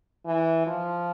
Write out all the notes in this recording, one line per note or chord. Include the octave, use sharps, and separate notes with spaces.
E3
F3